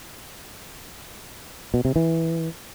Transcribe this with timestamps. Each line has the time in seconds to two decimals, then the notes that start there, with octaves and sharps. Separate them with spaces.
1.74 B2
1.85 C3
1.96 E3